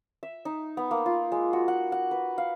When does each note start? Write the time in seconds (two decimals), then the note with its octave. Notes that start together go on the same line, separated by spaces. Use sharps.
0.23 E5
0.45 D#4
0.77 B3
0.91 A#3
1.06 F4
1.32 G#3
1.53 F#4
1.68 F#5
1.92 F#5
2.11 B4
2.38 F5